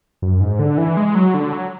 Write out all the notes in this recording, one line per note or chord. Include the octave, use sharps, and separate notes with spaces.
F#2
G#2
D3
E3
G#3
F#3
D3
F#3